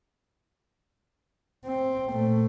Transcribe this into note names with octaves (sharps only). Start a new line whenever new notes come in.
C4
A#2 A3